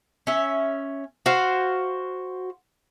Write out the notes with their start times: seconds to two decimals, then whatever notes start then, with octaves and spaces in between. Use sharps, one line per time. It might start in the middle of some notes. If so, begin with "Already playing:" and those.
0.27 C#4 E5
1.26 F#4 C5 F5